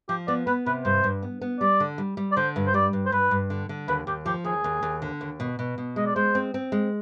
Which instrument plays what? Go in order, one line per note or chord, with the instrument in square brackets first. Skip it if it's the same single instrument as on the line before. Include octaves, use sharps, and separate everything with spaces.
[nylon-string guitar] F3 [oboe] G4
[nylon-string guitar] B3 [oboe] D5
[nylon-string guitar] B3 [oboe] B4
[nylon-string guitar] C3 [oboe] B4
[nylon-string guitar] G2 [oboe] C5
[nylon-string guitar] G2
B3
B3
[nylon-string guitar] G3 [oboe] D5
[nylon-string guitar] D3
G3
G3
[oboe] D5
[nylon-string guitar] D3 [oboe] C5
[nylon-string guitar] G2
[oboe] C5
[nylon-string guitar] G3 [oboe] D5
[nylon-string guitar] G2
[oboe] C5
[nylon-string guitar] G2 [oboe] B4
[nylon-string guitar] G2
D3
D3
[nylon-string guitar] D#2 [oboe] B4
[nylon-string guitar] D#2 [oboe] G4
[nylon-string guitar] F3 [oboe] G4
[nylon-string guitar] D#2 [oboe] G#4
[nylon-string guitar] D#2
D#2
D3
D#2
B2
B2
B2
[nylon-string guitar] G#3 [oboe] D#5
[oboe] D5
[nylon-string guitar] G#3 [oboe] C5
[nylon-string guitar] C4
C4
G#3